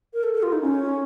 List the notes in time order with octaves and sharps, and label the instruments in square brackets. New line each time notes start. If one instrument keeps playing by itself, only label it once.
[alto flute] A#4
A4
A4
F4
D#4
C#4